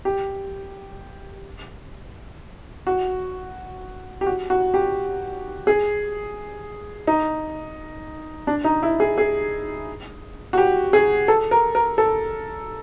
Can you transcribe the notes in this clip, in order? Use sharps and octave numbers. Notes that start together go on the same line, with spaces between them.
G4
F#4
G4
F#4
F#4
G4
G#4
D#4
D4
D#4
E4
G#4
G#4
F#4
G4
G#4
A4
A#4
A#4
A4